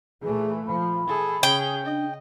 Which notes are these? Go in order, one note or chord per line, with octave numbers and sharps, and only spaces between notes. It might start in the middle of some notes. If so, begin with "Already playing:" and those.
A#2 E3 A3 G#4
F3 B5
E3 G#4 A4
C#3 C#4 G#4 G5
D4 D#5